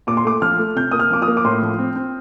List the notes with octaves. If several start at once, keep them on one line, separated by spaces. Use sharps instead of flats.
A#2 D6
C6
A3 D6
F3 F6
A3
C3 G6
A#3 D#6
F6
F3 D6
D#6
A#3
D6
A2 C6
F3
C4
C4